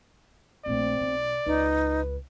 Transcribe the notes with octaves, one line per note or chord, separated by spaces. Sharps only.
A#1 A3 C4 D5
B1 B2
C#2 D#4 B4